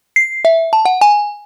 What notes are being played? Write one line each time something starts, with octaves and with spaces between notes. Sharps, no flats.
C7
E5
A5
F#5
G#5